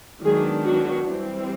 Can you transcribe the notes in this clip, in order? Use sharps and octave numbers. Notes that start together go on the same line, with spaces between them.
D#3 F#3 G#3 B3 D4 G#4
F#3 F#4
E3 G3 C4